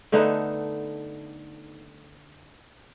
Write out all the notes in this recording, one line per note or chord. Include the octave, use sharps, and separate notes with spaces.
D3 A3 B3 D#4